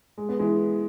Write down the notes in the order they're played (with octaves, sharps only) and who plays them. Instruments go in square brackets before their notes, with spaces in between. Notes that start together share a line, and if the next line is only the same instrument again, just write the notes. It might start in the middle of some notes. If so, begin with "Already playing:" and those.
[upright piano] G#3
B3
E3 G#3